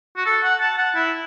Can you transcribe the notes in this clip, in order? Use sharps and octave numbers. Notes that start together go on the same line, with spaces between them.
F#4
A4
F#5
A5
F#5
E4